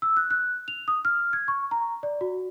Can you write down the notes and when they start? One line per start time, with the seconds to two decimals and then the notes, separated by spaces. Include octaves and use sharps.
0.02 E6
0.17 F#6
0.31 F#6
0.68 F7
0.88 D#6
1.05 F6
1.33 G#6
1.48 C#6
1.71 A#5
2.03 D5
2.21 F#4